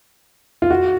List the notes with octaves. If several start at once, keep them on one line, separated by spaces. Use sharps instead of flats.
F4
F#4